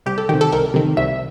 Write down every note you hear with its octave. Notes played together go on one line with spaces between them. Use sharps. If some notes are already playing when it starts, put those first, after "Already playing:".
C2 G4
A4
C3 D#3 G4
A4
C2 A#4
C3 D#3
C2 E5